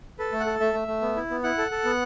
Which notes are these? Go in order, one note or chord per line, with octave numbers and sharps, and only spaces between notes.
A4 B4
A3
F#5
A4
A3 E5
A3
A3
B3
E4
B3
E4 F#5
A4
A4
B3